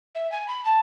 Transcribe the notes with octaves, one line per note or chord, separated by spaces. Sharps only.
E5
G#5
B5
A5